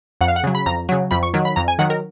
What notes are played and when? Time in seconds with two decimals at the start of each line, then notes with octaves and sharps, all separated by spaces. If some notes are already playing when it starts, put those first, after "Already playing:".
0.21 F2 F#5
0.28 F5
0.36 F#5
0.44 C#3 F#3
0.55 B5
0.66 F2 A#5
0.89 C#3 F#3
1.11 F2 B5
1.23 C#6
1.34 D#3 F#3
1.45 B5
1.56 F2 A#5
1.68 G#5
1.79 D#3 F#3 F#5
1.90 A#4